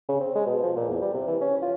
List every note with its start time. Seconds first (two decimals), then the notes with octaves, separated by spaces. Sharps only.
0.09 C#3
0.20 C4
0.35 G#3
0.46 B2
0.63 F3
0.76 A#2
0.89 E2
1.01 G3
1.14 C3
1.27 E3
1.41 C#4
1.62 F4